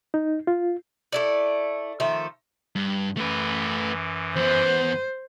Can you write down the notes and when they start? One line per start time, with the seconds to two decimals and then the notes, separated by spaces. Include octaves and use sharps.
0.14 D#4
0.47 F4
1.12 A3 E4 D5
2.00 D#3 F3 A3 E5
2.76 G2
3.17 F#2 E3 A3 B4
4.36 E2 B3 C5